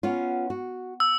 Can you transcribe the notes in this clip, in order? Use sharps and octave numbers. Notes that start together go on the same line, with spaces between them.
B3 C#4 F4
F#4
E6